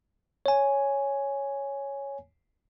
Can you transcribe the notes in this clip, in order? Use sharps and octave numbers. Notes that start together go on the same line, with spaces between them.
C#5 G#5